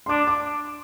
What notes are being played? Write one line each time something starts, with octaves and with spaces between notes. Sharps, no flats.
C6
D4 D6
D6